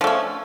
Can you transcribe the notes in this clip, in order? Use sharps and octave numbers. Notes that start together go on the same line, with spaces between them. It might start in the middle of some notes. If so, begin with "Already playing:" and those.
F3 A3 C#4